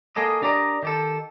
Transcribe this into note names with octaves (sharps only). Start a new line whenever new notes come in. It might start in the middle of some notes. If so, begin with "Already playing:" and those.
A#3 G#4 A4 D#5
D4 G4 A#4 D5 D#5
D#3 G4 A4